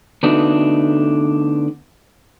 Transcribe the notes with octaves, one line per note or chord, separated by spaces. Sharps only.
D3 A3 B3 D4 D#4 F#4